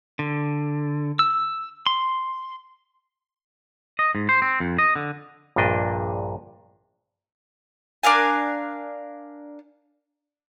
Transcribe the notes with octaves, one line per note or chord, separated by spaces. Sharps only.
D3
E6
C6
D#5
G#2
C5
C4
F2
D#5
D3
A#1 G2 A#2 D4 D#5
D4 A#4 F5 G#5